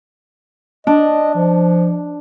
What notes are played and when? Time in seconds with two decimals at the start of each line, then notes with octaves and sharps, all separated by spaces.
0.87 D4 D#5
1.35 F3